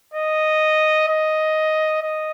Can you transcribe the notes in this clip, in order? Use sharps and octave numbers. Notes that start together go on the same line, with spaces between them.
D#5
D#5
D#5